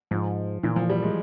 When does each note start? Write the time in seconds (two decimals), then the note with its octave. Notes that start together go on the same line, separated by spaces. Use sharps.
0.11 G#2 F3
0.63 A#2 E3
0.76 F3
0.90 G3
1.03 G#3